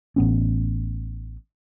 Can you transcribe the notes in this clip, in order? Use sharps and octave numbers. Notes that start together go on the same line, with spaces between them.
A1 B3 C#4